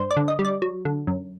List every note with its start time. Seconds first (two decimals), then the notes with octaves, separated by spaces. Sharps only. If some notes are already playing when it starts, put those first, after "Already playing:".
Already playing: G2 C5
0.11 D5
0.17 D3
0.28 D#5
0.39 G3
0.45 D5
0.62 F#3
0.85 D3
1.07 F#2